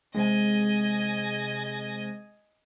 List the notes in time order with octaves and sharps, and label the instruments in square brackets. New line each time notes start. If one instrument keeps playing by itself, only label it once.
[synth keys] C3 G#3 [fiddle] D#5 G#5